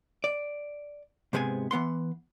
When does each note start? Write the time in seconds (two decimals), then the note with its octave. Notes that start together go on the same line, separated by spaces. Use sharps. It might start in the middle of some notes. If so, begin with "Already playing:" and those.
0.24 D5
1.33 G#2 C3 G#3 B3 G#5
1.71 E3 B3 F#5 C6